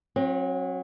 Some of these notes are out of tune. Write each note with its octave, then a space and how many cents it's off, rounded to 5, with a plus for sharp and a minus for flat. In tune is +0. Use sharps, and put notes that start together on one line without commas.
F#3 -20 C4 +35